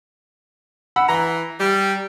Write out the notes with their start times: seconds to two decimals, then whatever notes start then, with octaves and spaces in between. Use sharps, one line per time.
0.96 F#5 B5 E6
1.09 E3 A#5
1.59 G3